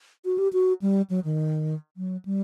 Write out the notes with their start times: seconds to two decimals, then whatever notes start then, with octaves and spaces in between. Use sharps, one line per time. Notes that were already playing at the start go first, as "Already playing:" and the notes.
0.25 F#4
0.38 G4
0.53 F#4
0.82 G3
1.10 F#3
1.24 D#3
1.97 F#3
2.25 G3